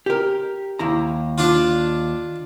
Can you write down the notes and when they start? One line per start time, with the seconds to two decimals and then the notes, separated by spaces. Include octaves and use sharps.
0.06 G4 A#4
0.79 D#2 E4 A#5
1.38 D4 F4